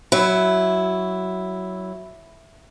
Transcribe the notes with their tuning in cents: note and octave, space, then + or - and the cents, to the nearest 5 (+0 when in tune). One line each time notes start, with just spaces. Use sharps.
F#3 +10 E4 +0